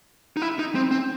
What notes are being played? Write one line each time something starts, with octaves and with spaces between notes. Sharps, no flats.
D#4
E4
D#4
C4
C4